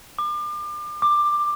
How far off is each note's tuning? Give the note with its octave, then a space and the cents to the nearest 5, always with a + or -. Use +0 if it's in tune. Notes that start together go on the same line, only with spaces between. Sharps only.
D6 +35
D6 +15